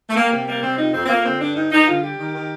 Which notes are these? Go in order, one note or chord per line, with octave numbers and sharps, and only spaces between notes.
A3
G3 A#3
C3 A#3
G3 A#3
C3 C4
F2 D#4
F2 C4
C4
F2 A#3
D3 C4
G2 D4
G2 D#4
G2 D#4
D3 F4
G3 G4
D#3
D#3